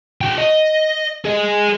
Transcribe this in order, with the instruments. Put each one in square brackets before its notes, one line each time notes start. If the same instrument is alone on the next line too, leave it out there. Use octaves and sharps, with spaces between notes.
[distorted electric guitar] F#4 G5
D#5
G#4 D#5